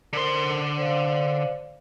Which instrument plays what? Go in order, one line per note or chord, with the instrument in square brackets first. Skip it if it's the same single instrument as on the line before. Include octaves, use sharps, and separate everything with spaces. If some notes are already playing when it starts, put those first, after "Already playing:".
[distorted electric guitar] D3 C6 [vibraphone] A#4 C5
[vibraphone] C5 D5 F5